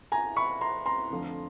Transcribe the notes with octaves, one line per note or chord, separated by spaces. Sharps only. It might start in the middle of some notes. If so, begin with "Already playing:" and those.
G#5 A#5
B5 C#6
A#5 C6
A#5 C6
F1 F2 D3 F3